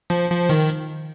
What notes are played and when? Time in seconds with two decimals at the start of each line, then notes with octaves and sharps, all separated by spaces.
0.10 F3
0.30 F3
0.49 D#3